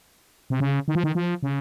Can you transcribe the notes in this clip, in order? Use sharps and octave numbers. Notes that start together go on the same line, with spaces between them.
C3
C#3
D#3
F3
D#3
F3
C#3